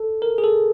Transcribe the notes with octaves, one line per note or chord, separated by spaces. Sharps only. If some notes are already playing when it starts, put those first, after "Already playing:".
Already playing: A4
A#4
G#4
A4